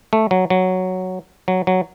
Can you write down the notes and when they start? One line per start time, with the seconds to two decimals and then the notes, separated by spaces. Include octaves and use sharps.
0.13 A3
0.31 F#3
0.50 F#3
1.48 F#3
1.67 F#3